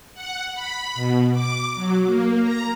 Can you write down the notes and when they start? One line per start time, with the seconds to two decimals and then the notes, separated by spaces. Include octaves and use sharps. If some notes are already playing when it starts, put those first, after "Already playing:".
0.14 F#5
0.54 B5
0.95 B2
1.32 D6
1.74 F#3
2.06 A#3
2.42 A#5